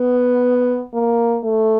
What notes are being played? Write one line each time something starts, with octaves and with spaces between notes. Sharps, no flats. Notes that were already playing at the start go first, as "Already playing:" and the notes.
Already playing: B3
A#3
A3